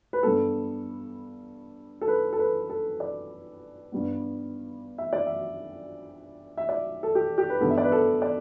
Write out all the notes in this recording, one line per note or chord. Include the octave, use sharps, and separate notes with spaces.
B4
G2 G3 B3 A4
A4
B4
A4
B4
A4
D5
G2 G3 B3
E5
D5
E5
E5
D5
A4
G4
G4
B4
G2 D3 B3 A4
E5
D5
B4
A4
D5